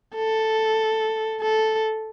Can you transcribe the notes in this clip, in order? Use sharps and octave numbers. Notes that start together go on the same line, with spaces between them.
A4
A4